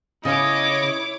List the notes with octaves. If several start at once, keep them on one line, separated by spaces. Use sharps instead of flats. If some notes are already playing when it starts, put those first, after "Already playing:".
C#3 E4 C#5 D#5 D6